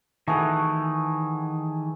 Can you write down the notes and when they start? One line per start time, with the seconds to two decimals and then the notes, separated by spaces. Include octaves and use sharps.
0.28 D#3 E3 A3 G#4 F#5